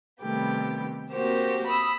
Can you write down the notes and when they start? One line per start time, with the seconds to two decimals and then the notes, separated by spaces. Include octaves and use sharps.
0.21 C3 D#3 G3 A3 B3 G4
1.10 A#3 C4 F#4 G4 A#4 C5
1.67 B5 D#6 E6